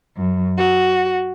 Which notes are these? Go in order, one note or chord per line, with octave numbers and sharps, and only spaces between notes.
F#2
F#4